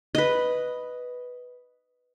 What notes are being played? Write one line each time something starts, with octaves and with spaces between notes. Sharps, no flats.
B4 D#5